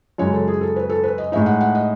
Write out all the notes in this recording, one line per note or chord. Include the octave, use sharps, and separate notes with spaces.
F#2 C#3 G#3 C#5
A4
G#4
A4
B4
A4
B4
D#5
A2 G#3 D#4 E5
F#5
F#5
D#5